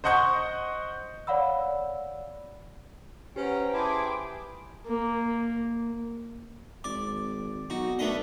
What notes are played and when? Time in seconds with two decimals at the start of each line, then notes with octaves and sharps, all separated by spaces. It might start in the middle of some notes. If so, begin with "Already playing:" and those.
0.04 C5 D#5 F#5 C#6 G6
1.27 C#5 D5 F5 F#5 B5 E6
3.36 C#4 G4 B4 C5 F#5 G5 A#5
3.73 E4 G#4 G5 A5 C6 D6 D#6
4.86 A#3
6.84 G#1 D5 D6
7.70 B1 D#4 F#4
7.99 A3 B3 D4 D#5